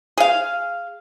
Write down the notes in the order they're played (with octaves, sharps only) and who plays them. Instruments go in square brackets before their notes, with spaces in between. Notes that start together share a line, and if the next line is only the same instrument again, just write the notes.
[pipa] G#4 F5